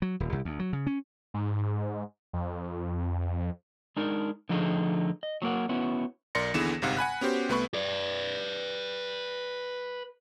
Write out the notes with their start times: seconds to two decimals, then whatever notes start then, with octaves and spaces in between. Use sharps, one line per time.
0.02 F#3
0.20 D#1
0.32 C2
0.45 D2
0.59 F#3
0.73 C#3
0.87 C#4
1.34 G#2
2.33 F2
3.97 G#3 D4 D#4 A#4
4.49 D3 F3 A3 D#4 G#4
5.23 D#5
5.42 F#3 A#3 A#4 F#5
5.69 B3 C#4 E4 F#4
6.35 B1 A#4 D5 C6 A#6 C#7
6.54 D#2 D3 E3 B3 G#4 E7
6.82 G1 G#2 C3 F5 F#5
6.97 F#5 G#5 B5 F#6
7.21 B3 C#4 F#4 G4 C5
7.49 C2 A3 B3 B4 B5 C#6
7.74 B4 D5